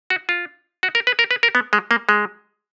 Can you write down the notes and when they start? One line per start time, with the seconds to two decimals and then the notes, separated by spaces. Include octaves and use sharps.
0.10 F#4
0.29 F4
0.83 F#4
0.95 A#4
1.07 B4
1.19 A#4
1.31 B4
1.43 A#4
1.55 B3
1.73 G#3
1.91 A#3
2.09 G#3